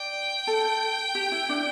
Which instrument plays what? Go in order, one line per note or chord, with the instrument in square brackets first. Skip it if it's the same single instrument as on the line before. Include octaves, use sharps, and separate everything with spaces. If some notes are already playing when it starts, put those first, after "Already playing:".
Already playing: [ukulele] D5 [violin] G5
[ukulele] A4
G4
E4
D4